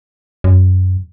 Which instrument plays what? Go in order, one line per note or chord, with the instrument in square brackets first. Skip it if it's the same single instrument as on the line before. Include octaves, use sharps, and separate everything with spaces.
[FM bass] F#2